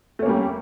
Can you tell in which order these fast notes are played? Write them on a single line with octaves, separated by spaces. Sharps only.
A3 C#4 A#3 G3